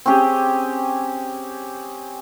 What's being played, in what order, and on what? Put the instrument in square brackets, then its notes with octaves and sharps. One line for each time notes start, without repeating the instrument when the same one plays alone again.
[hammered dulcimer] C4 C#4 G4 G#4